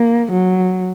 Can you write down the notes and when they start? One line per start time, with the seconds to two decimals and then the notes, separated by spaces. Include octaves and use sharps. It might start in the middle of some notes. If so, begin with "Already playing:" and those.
Already playing: A#3
0.32 F#3